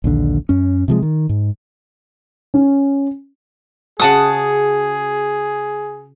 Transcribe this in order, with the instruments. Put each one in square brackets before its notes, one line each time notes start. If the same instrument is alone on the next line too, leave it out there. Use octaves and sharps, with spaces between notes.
[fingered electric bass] A#1 D#2 D3
F#2 C#4
C3 F3 G#3
D#3
G#2
[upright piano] C#4
[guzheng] C#3 F#4 [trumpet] G#4 [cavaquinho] F#5 A5 D#6